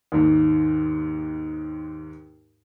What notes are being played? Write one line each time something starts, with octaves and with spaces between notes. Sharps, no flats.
D#2 G#2